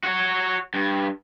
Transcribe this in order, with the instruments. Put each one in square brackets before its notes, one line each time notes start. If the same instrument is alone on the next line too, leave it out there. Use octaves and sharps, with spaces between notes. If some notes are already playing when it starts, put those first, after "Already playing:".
[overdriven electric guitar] F#4 C#5
G2